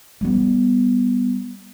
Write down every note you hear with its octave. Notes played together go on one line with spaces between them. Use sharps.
G3 B3